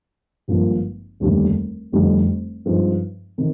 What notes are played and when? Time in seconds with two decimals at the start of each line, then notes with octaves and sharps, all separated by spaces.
0.48 G#1 G2 F3 A#3
1.20 F1 D#2 D3 G3 D4
1.92 F1 F2 D3 G3
2.66 G2 F3 G#3 C4 D#4
3.38 C3 D#3